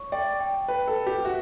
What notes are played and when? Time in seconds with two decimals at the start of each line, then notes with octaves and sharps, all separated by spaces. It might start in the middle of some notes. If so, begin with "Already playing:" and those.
Already playing: C#5 C#6
0.12 D5 G5
0.40 G5
0.68 B4 G5
0.88 A4
0.96 B4
1.07 G4
1.24 F#4 E5